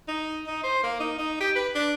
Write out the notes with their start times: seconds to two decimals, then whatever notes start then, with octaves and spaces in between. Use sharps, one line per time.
0.08 D#4
0.47 D#4
0.63 C5
0.84 A#3
1.00 D#4
1.19 D#4
1.41 G4
1.56 B4
1.75 D4